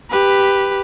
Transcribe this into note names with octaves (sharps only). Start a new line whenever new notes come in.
G4 B4